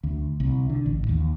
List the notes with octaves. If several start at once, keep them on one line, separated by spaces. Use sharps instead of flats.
D2
C2
D3
A1
D#2